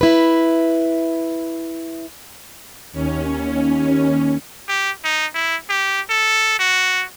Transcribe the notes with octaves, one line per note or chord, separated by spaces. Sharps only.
E4 B4
D#2 C#4
G4
D#4
E4
G4
A4
F#4